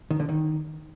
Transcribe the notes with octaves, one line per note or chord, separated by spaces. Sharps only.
D#3
D3
D#3